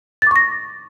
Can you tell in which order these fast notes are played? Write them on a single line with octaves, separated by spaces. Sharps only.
A6 D6 C#6 A#6